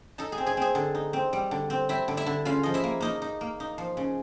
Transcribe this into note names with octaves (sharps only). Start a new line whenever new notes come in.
D#4 A4 A5
G#4 G#5
C4
G#4 G#5
C4 G#4 G#5
D3
D#4
C4
G3
D3
C4
C4 E4 E5
D3
E4 E5
D3
C#3 F4 F5
F3 D#5
E4 E5
A#3
A#3 D#4 D#5
D#4
A#3
D#4
F3
C#3